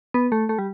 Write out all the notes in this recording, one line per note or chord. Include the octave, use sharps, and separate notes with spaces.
B3
A3
A3
G3